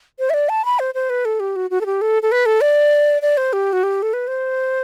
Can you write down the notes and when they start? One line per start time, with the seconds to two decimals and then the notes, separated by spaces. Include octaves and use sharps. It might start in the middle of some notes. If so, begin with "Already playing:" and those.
0.19 C5
0.30 E5
0.34 D5
0.49 A5
0.65 B5
0.79 C5
0.95 C5
1.10 B4
1.25 A4
1.40 G4
1.56 F#4
1.70 F#4
1.81 A4
1.86 G4
2.01 A4
2.23 A4
2.32 B4
2.46 A4
2.61 D5
3.22 D5
3.37 C5
3.53 G4
3.73 F#4
3.83 G4
4.02 A4
4.13 B4
4.28 C5